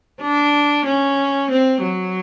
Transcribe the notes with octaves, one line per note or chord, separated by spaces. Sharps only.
D4
C#4
C4
F#3